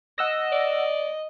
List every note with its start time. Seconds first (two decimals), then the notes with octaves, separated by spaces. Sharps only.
0.18 D#5 F#5 E6 A#6
0.52 D5